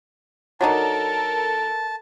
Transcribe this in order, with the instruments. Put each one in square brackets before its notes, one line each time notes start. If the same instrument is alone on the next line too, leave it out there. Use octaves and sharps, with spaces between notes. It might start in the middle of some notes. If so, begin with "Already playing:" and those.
[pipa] F#3 D4 D#4 [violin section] A4 A#4 [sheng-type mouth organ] A5